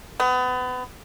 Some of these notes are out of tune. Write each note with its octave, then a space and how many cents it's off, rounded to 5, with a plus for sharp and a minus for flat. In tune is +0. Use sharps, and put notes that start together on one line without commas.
B3 +30